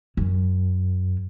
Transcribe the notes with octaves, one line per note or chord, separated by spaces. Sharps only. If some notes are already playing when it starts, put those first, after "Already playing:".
F#2